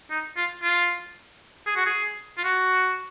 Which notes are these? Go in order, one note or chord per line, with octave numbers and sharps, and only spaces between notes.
D#4
F4
F4
G#4
F#4
G#4
F4
F#4